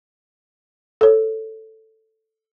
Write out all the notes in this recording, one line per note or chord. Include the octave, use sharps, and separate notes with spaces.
A4 C#5